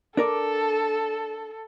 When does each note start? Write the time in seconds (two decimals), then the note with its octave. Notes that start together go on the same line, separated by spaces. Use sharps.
0.17 D4 A4 A#4 D5